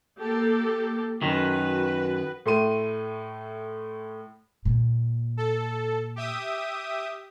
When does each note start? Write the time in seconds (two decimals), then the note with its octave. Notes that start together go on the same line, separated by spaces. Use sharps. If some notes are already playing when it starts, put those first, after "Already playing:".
0.20 A#3 G4 A4
1.22 F#2 D#3 F#4 B4
2.46 A2 A3 C6 D#7
4.65 A#2
5.37 A4
6.16 G4 E5 D#6